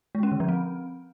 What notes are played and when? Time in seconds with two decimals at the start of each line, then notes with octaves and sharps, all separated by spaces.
0.15 G#3
0.23 C#4
0.32 D3
0.40 F3
0.49 C4